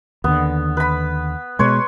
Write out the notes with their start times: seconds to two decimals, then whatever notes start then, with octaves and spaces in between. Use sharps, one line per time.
0.24 D#2 D3 B3
0.77 B4 B5
1.59 B2 G#3 B4 C#5 C6